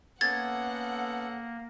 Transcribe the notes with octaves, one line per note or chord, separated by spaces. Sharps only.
A#3 B3 C#4 A4 F#5 G#6 A6